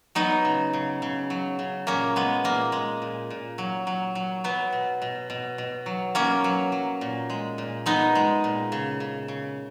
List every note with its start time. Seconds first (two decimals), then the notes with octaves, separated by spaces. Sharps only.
0.15 F#3 B3 D#4
0.45 C#3
0.73 C#3
1.02 C#3
1.30 F#3
1.59 C#3
1.87 A#2 A#3 C#4
2.16 G#3 B3
2.44 A#2 A#3
2.72 G#3
3.02 A#2
3.30 A#2
3.58 F#3
3.87 F#3
4.15 F#3
4.44 F#3 B3
4.73 B2
5.02 B2
5.30 B2
5.58 B2
5.86 F#3
6.15 B2 A#3 C#4
6.44 F#3
6.72 F#3
7.01 A#2
7.30 G#3
7.58 A#2
7.86 G#3 B3 D#4
8.15 G#3
8.44 A#2
8.72 C#3
9.00 C#3
9.28 C#3